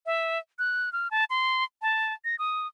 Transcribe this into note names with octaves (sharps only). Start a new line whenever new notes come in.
E5
F#6
F6
A5
C6
A5
A#6
D#6